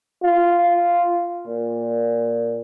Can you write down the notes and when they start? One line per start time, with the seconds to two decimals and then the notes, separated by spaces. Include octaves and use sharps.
0.23 F4
1.48 A#2